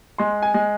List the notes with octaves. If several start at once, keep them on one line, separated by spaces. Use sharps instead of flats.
G#3 C6
G#5
G#3